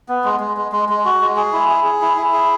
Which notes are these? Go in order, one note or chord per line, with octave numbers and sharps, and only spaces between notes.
B3
G#3
G#3
G#3
G#3
G#3
F#4
G#3
G#4
E4
G#4
G#4
E4
E4
G#4